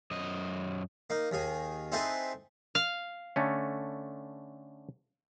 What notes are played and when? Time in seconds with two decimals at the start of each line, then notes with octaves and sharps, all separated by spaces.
0.11 F#2 D#5
1.10 A#3 D#4
1.31 D#2 D#3 G#4
1.92 C4 D#4 E4 G#4 A4 B4
2.75 F5
3.36 D3 A3 C#4